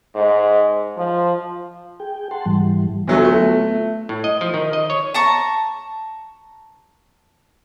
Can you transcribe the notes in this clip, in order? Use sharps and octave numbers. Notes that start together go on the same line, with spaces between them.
G#2
F3
G#4 G5
F#5 A5 C6
G#2 E3 G3
D2 F#3 A3 B3 F4
A3
A2
D#5
F3
D#3
D#5
C#5
A5 A#5 C#6